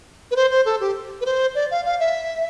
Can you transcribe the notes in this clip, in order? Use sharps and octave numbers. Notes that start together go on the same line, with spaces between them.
B4
C5
C5
A4
G4
B4
C5
D5
F5
F5
E5